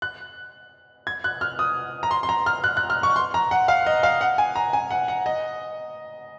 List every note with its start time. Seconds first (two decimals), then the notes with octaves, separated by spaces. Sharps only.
0.02 F#6
1.07 G#6
1.24 F#6
1.41 F6
1.59 D#6
2.03 A#5
2.11 C6
2.23 C6
2.29 A#5
2.46 F6
2.64 F#6
2.77 F#6
2.90 F6
3.03 C#6
3.16 C6
3.34 A#5
3.51 F#5
3.68 F5
3.86 D#5
4.03 F5
4.21 F#5
4.38 G#5
4.56 A#5
4.73 G#5
4.91 F#5
5.08 F#5
5.26 D#5